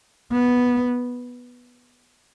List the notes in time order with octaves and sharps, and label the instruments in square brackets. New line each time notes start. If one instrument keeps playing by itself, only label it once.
[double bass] B3